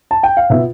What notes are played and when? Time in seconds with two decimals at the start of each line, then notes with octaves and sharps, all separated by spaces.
0.11 A5
0.23 G5
0.37 F5
0.50 B2 B3 F4 E5